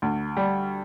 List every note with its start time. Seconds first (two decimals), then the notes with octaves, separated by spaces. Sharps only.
0.02 D2
0.37 G3